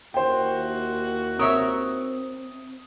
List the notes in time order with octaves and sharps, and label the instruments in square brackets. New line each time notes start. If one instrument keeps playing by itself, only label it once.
[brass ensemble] D#2 E4 F#4 [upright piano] C5 G5
[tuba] C4 [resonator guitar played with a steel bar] A#4 C#5 E5 [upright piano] D#6